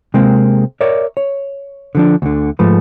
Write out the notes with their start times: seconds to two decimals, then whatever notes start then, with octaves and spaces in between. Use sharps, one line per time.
0.14 C3 G#3 A#3 C4
0.81 A#4 C#5 D5 E5
1.17 C#5
1.95 D3 F3 D4
2.22 D2 D3
2.59 G#2 F3 A3 B4